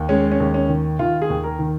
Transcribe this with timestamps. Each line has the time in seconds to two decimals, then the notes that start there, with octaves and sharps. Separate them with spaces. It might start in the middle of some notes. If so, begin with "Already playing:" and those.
Already playing: D#2
0.09 G#3 C#4
0.32 C#4
0.40 D#2
0.54 C#4
0.69 D#3
0.99 D#3 F4
1.22 G#4
1.30 D#2
1.44 A#4
1.59 D#3